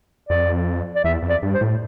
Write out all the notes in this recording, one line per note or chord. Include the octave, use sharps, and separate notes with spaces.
F2 D5
D5
E2 E5
F2
D5
G2
C5
A2